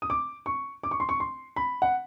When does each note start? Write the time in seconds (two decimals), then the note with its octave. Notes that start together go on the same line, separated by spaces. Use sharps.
0.02 D#6
0.10 D6
0.46 C#6
0.83 D6
0.91 C#6
1.00 C6
1.09 C#6
1.20 C6
1.56 B5
1.82 F#5